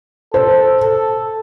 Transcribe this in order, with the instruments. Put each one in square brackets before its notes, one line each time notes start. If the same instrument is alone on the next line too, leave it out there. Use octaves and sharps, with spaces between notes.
[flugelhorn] A4 [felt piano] C5
[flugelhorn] A4